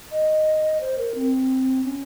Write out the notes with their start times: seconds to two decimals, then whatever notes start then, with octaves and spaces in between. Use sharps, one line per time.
0.12 D#5
0.81 C5
0.98 A#4
1.15 C4
1.84 C#4